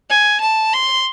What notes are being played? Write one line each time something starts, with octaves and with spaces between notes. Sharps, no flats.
G#5
A5
C6